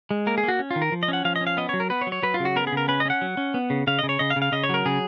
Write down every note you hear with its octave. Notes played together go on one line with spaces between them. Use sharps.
G#3
A#3 A#4
G#4
A#3
F#4
C#4
F4
D#3
A#4
F3
D#5
C#4 F#5
F3 F5
D#5
C#4
F5
B3 D#5
F#3 C#5
A#4
B3 B4
C#5
F#3
C#5
F#3 B4
F4
C#3
F#4
B3 A#4
G#4
C#3 A#4
C#4 B4
D#5
C#4 F#5
F#3
C#4
B3
C#3
C#3 F5
C#3 D#5
C#5
C#3 D#5
F5
C#3
F5
C#3 D#5
C#5
F#3 A#4
C#3 G#4